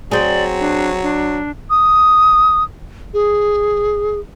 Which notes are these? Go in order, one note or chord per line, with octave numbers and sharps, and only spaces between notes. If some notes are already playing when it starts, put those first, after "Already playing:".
F#3 C4 G#4 D5
D4
D4
D#6
G#4